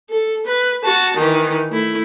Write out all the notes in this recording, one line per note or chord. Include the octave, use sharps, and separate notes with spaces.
A4
B4
F#4 A5
D#3 E3
A3 E4